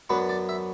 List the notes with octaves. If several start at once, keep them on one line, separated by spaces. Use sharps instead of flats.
F#2 F#3 B3 D4 B4
D5
E5